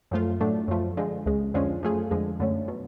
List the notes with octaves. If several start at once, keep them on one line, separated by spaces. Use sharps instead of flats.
F#2 F3 A3 F4
A2 F#3 A3 D4
F#2 F3 A3
D3 F3 G#3
C#2 C#3 G#3
F2 D3 F3 G#3 C#4
F#2 F3 A3 F4 G#4
F2 D3 F3 G#3
F#2 D3 F#3 A3 C#4
B2 F#3